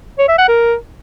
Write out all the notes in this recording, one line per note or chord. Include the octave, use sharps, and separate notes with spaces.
C#5
E5
F#5
A#4